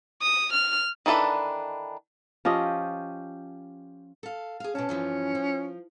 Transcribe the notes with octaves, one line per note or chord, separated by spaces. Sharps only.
D#6
F6
D#3 E3 D4 A4 B4
F3 C#4 G4 D#5
A4 F5
G#4 F5
B2 C#4 A5
G2 E3 F3
F3